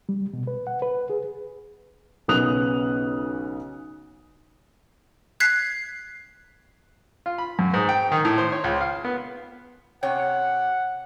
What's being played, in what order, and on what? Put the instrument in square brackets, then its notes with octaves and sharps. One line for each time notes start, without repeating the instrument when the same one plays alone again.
[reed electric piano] G3
B2
B4
F#5
B4
G#4
[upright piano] B1 C#3 B3 D#6 F#6 F7
[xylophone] F#6 G#6 B6 C7
[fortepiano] F4
B5
F#2
G#2
G5
D#3
A2
C5
C#5
C#2
F5
B3
[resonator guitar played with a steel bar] C3 C#4 G5 [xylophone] C#5 [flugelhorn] F#5